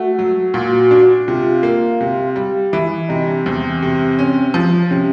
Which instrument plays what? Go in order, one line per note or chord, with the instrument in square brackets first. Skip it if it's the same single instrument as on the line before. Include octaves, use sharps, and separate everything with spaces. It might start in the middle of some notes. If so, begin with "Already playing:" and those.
Already playing: [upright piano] A3 [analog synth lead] F#4
[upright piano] F#3
[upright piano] A#2 [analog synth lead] F#4
[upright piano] D4
[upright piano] C3 [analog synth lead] F4
[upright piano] A#3
C3
G3
[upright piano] E3 [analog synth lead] E4
[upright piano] C3 [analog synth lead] D#4
[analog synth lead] D4
[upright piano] E2 [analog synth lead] C4
[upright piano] C3
C#4
F3
[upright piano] C3 [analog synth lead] C#4